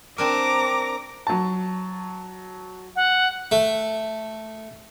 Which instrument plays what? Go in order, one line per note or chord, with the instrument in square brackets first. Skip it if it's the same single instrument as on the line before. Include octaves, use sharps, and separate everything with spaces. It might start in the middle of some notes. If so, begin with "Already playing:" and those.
[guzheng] C4 D4 A#4 [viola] A#5 D6
[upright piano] F#3 A5
[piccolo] F#5
[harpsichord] A3